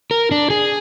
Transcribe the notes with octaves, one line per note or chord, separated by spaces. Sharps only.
A#4
D4
G#4